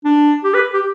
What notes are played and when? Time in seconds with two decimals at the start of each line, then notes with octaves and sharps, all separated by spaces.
0.05 D4
0.44 G4
0.54 B4
0.73 G4